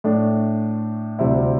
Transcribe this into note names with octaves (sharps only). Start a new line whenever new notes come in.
A2 A3 D4
D2 C3 G3 C4 E4